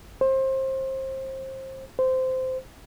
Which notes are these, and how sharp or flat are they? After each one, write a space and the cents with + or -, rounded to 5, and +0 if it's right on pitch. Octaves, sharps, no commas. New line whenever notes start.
C5 +25
C5 -15